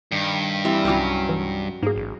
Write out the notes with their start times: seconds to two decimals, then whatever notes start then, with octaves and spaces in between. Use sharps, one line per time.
0.12 G2 D#3
0.65 E3 G3 C4
0.85 C2 F#3 C#4 C5 B5 D6
1.29 E3
1.83 G#2 A#3 G#4
1.96 A1